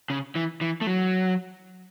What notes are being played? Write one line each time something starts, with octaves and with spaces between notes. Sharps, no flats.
C#3
E3
E3
A3
F#3